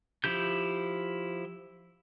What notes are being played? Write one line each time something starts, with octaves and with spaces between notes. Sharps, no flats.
F3 E4 G4 G6